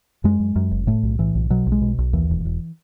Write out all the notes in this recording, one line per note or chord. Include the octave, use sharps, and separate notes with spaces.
F#2 G#3
F#2
F#2
F#1
A2 A3
B1
A2 E3
B1
B2 F#3
B1
G#3
B2
B1
D#2 E3
E1
E1